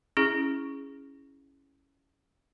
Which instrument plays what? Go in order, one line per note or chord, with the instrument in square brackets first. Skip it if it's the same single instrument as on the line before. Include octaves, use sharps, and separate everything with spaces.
[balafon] C#4 E4 G#4